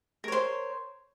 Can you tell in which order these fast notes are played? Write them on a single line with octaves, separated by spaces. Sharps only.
A#4 C#5 C5